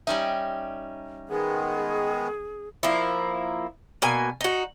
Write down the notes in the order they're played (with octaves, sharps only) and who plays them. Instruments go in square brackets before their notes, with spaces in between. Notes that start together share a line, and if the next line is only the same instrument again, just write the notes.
[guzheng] G3 C#4 D#4 [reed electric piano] E5
[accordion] D#3 G#3 B3 [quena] G#4
[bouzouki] F3 A#3 E4
B2 A#3 G#5
D#4 F#4